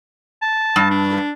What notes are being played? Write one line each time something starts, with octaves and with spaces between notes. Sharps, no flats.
A5
G2
D4